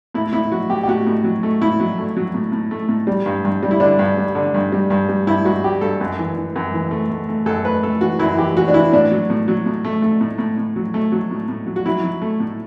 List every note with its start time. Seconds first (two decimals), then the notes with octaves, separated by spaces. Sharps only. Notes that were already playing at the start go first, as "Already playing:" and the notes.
0.14 A2 E4
0.33 A2 E4
0.52 F#3 F#4
0.69 A2 G4
0.83 G4
0.88 A2 F#4
1.07 A2
1.24 F#3
1.43 A3
1.61 A2 E4
1.80 F#3
1.98 A3
2.17 F#3
2.34 A2
2.52 A2
2.71 A3
2.89 A2
3.07 G3
3.26 G2
3.45 G2
3.63 G3
3.71 E4
3.80 D3 D4
3.99 G2
4.17 G3
4.35 D3
4.54 G2
4.72 G3
4.90 G2
5.09 G3
5.27 G2 E4
5.45 G2 F#4
5.63 G3 G4
5.81 G2 A4
6.01 F#2
6.19 E3
6.37 E3
6.56 F#2
6.74 E3
6.91 A3
7.10 A3
7.29 A3
7.46 F#2 A4
7.64 A3 B4
7.83 A3 A4
8.01 E3 F#4
8.19 F#2 E4
8.38 E3 G4
8.57 E3 F#4
8.68 D4
8.74 E3 E4
8.93 A2 D4
9.11 F#3
9.30 A2
9.48 F#3
9.66 A2
9.85 A3
10.02 A3
10.21 A2
10.39 A2
10.58 A2
10.76 F#3
10.94 A3
11.12 F#3
11.31 A2
11.48 A2
11.67 F#3
11.76 F#4
11.86 F#3 E4
12.04 F#3
12.22 A3
12.40 A2